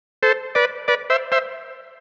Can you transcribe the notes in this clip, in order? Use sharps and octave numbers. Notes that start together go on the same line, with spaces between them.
A4 C5
B4 D5
B4 D5
C5 E5
C5 E5